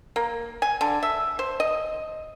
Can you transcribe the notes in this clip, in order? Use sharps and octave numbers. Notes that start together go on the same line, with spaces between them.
A#3
G#5
D3
E5
C5
D#5